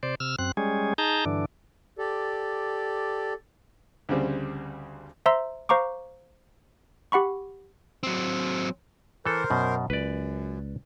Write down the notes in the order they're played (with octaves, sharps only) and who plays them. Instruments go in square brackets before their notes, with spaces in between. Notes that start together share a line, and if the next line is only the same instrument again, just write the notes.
[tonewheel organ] C3 C5 D5
C3 E6 F6
F#2 C4 F#6
G3 G#3 C#4 G#4
D#4 G#4 A5 A#5 G6
G2 D3 E3 D4
[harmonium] G4 A4 D5
[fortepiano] D2 C#3 G3 C4
[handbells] C5 E5 A#5 C6 E6
C5 F5 A#5 C#6 D6
G4 F#5 B5 C#6
[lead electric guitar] F#3 C4
[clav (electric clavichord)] E3 A4 [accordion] A#4 C5
[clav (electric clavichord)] F#2 B2
[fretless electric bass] C#2 [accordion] F#2 [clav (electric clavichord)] B4 D5